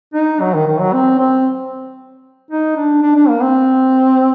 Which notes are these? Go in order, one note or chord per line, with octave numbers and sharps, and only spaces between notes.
D#4
F#3
D#3
D#3
F#3
C4
C4
D#4
D4
D4
D4
A#3
C4